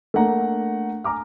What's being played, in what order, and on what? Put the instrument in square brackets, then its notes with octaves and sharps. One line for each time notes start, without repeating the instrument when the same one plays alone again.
[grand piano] A3 A#3 D4 F#5 A#5
G#5 A#5 D6 F6